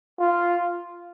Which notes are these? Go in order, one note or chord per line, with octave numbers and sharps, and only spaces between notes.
F4